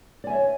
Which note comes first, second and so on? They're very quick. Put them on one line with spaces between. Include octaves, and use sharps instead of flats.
D5 G#5 E5 C#5